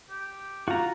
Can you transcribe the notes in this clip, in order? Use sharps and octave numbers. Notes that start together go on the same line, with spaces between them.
G4
F4 F#4 A#5